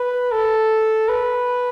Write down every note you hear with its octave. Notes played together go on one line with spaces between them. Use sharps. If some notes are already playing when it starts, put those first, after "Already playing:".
Already playing: B4
A4
B4